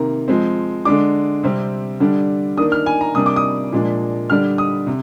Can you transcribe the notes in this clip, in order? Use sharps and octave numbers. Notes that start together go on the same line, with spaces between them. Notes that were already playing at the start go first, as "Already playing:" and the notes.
Already playing: C3 D#3 A#3 A#5
F3 G#3 C4
D3 G#3 D4 D6
C3 G3 C4
D3 G3 D4
D#3 A#3 D4 D#6
F6
G#5
A#5
C3 G3 A#3 D4 D#6
D6
D#6
A#2 F3 G#3 D4
D3 G3 D4 F6
D#6
C3